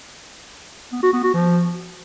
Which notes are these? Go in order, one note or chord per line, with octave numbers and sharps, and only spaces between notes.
B3
F#4
B3
F#4
F3